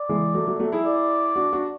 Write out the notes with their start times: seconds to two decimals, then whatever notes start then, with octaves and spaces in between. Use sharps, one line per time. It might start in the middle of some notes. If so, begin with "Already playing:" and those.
Already playing: D5
0.09 E3 G#3
0.34 F#3 A3
0.47 F#3 A3
0.59 F#3 A3
0.72 E4 G#4
0.85 D5
1.36 D4 F#4
1.53 D4 F#4